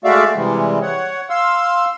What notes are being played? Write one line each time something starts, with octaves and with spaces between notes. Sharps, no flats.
G#3 A3 F#4 D5 E5 F5
C3 E3 G3 G#3
C#5 F#5
F5 C6 E6